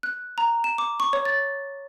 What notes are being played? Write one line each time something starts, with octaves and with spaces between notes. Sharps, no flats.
F#6
A#5
E7
D6
C#6
C#5
A6